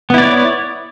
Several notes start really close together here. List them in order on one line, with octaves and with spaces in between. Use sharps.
B3 E4 D5 C#5